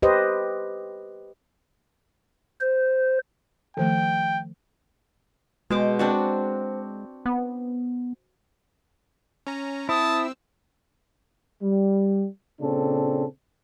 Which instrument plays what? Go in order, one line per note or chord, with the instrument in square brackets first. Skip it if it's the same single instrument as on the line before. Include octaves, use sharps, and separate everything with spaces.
[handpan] G4 B4 C5 D#5
[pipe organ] C5
[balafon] D#3 F3 A3 [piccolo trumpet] G5
[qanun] B2 C5 D6 [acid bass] G#3
[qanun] C4 D4 F#4
[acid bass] B3
[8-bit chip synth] C#4 A#5
[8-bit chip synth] C4 E6 [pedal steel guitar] E4 [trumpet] A5 [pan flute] D#6
[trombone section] G3
A#2 C#3 A#3 C4 D4 A4